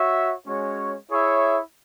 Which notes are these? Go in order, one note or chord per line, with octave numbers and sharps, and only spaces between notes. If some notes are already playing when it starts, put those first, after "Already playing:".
Already playing: F#4 C#5 E5
G#3 C#4 F#4 C#5
E4 G#4 C#5 E5